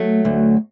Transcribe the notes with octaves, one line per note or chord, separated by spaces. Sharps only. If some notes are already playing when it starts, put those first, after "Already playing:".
Already playing: F#3 A3
D2